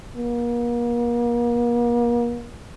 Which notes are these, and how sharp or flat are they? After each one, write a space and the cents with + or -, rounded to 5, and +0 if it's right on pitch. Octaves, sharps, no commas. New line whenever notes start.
A#3 +40